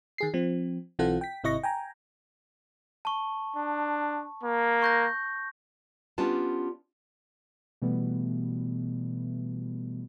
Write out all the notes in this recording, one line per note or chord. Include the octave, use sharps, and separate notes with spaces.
D#3 G#4 C7
F3 C4
B1 E3 C4 F4 A4 F#5
G5 B6
G#1 C3 E4 D#5 C#6 A#6
G5 G#5 A#5
A5 C#6
D4
A#3
C#6 G6 A#6
G3 B3 C#4 D4 F4 A5
B2 E3 G3 A3 B3